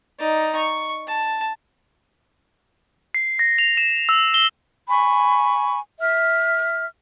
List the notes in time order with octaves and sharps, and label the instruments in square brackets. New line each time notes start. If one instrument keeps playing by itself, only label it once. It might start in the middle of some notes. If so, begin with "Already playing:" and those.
[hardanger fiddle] D#4 D5
C#6
A5
[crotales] C7
A#6
F7
E7
E6
G7
[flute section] G#5 B5 C#6
E5 F6